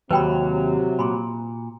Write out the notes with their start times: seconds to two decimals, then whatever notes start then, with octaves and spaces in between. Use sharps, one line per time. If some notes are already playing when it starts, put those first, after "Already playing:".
0.11 D#2 C3 F#3 B4 G5 B5
0.99 A#2 B5 C6